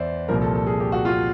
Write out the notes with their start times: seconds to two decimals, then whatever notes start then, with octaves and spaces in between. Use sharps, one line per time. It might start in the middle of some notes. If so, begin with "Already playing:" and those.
Already playing: E2 C5 D5 E5
0.28 C2 A#2 F3 A#4
0.41 A4
0.55 A4
0.67 G#4
0.80 G4
0.92 F#4
1.05 F4